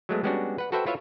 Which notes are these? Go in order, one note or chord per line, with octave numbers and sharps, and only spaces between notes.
F#3 G#3 A3 B3
G3 G#3 B3 C#4 D4 F#4
B4 F#5
F#4 A4 B4 C5 E5 G5
E4 F4 B4 C#5 E5 F5